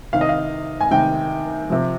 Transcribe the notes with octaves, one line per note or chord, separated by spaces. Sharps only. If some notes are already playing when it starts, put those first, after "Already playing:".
C3 D#3 F5
D#5
F5
G#5
C3 D#3 G5
C3 F3